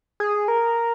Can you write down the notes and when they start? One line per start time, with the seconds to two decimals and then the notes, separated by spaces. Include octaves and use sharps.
0.20 G#4
0.48 A#4